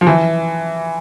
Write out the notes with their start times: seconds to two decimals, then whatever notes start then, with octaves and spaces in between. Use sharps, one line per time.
0.01 F3
0.07 E3